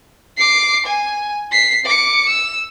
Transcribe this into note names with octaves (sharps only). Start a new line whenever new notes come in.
D6 C7
G#5
B6 C7
D6 C#7
E6